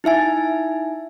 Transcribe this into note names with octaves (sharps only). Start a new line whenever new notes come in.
D#4 E4 E5 G#5